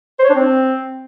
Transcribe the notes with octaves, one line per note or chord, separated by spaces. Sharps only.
C5
C#5
D4
C4